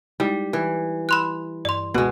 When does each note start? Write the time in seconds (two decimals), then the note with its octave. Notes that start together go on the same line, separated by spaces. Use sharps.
0.20 G3 G#3 D#4 E4
0.53 E3
1.09 B5 C6 F#6
1.65 G2 D5 C6
1.94 C#2 B2 G#3 B3 F#5